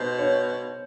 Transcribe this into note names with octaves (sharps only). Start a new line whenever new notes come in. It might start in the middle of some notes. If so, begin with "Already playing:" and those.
Already playing: B2 C5
C#5